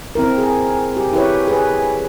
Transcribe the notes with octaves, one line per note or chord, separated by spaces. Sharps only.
C4 E4 A#4
G#4
G4
E4 G4 B4 C#5
G#4 B4